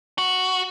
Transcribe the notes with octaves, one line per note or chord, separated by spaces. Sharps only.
F#4